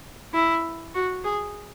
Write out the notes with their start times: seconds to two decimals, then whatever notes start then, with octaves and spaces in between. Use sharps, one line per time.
0.34 E4
0.94 F#4
1.24 G#4